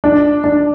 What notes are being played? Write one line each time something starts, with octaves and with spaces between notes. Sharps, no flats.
D4
D4